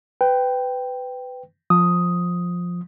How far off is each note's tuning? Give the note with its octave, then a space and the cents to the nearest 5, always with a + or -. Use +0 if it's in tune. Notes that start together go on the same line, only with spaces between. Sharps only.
B4 +20 G5 +0
F3 +10 D#6 +5